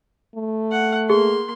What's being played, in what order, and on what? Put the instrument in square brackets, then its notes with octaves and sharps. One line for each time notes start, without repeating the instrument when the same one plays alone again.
[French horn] A3
[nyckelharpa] F#5
[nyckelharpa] A#3 C6 [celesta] G#4